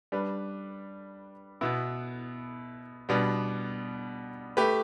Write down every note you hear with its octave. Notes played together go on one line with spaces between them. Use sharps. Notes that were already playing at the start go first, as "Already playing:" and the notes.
G3 D4 B4
B2 B3 E4
B2 G3 B3 D4
A3 G4 B4